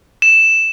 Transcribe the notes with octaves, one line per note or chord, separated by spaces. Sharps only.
E7